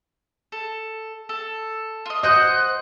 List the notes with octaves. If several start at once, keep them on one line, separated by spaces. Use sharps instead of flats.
A4
A4
F4 D#5
C5 D#5 F#5 F#6 G6